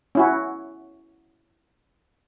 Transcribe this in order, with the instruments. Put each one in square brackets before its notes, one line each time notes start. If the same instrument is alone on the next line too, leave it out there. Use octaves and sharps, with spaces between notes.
[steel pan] C#4 E4 F#4